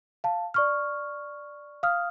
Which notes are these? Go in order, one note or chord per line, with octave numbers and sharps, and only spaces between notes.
F5 A5
D5 C#6 F6
F5 D#6 F6